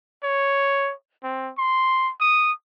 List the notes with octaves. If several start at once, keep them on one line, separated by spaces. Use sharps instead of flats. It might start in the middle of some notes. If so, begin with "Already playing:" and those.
C#5
C4
C6
D#6